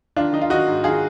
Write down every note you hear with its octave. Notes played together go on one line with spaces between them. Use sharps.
D#3 D4 F4
D#3 D#4
F4
D#3 D#4 F#4
G#2
D#3 F4 G#4